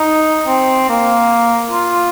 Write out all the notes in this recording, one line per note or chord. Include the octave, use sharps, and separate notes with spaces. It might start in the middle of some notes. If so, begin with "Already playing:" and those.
Already playing: D#4
C4
A#3
F4